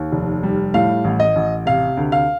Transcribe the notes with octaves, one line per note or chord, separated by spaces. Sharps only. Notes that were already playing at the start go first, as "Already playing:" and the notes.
Already playing: D#2
F1
G3
A2 F5
A1
D#5
A1
C3 F5
D2
F5